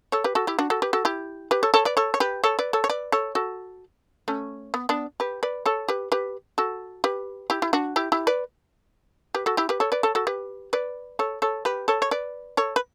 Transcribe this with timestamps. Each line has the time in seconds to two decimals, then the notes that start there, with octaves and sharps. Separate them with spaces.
0.12 A4 C#5
0.24 G4 B4
0.35 F#4 A4
0.47 E4 G4
0.59 D4 F#4
0.70 F#4 A4
0.82 G4 B4
0.93 F#4 A4
1.05 E4 G4
1.51 G4 B4
1.63 A4 C#5
1.74 A4 C#5
1.85 B4 D5
1.97 A4 C#5
2.14 C#5
2.20 G4 B4
2.44 A4 C#5
2.59 B4 D5
2.73 A4 C#5
2.84 C#5
2.89 B4 D5
3.12 A4 C#5
3.35 F#4 A4
4.28 A3 C#4
4.74 B3
4.89 B3 D4
5.20 G4 B4
5.43 B4 D5
5.66 A4 C#5
5.88 G4 B4
6.12 G4 B4
6.58 F#4 A4
7.04 G4 B4
7.50 E4 G4
7.62 E4
7.73 D4 F#4
7.96 E4 G4
8.12 E4 G4
8.27 B4 D5
9.35 G4 B4
9.46 F#4 A4
9.57 E4 G4
9.69 G4 B4
9.80 A4 C#5
9.92 B4 D5
10.03 A4 C#5
10.15 F#4 A4
10.27 G4 B4
10.73 B4 D5
11.19 A4 C#5
11.42 A4 C#5
11.65 G4 B4
11.88 A4 C#5
12.02 C#5
12.11 B4 D5
12.57 A4 C#5
12.76 B4